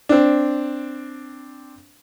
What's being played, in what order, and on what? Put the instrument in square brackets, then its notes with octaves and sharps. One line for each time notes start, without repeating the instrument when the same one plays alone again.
[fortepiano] C4 D4